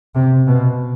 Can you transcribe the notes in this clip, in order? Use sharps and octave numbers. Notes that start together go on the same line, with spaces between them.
C3
B2